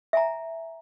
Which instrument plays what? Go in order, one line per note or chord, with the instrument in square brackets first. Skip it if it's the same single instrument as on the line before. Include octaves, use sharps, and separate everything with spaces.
[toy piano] E5 G#5 A#5